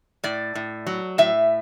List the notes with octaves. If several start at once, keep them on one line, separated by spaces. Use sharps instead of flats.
A2 D5
A2
F#3
A2 E5